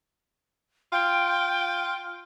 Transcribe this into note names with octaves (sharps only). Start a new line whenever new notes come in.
F4 G5